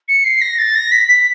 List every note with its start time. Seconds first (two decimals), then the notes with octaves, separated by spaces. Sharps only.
0.08 C#7
0.24 C7
0.41 A#6
0.58 A6
0.75 A#6
0.92 B6
1.08 B6